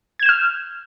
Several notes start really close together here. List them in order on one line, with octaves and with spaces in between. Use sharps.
G#6 E7 G6 F6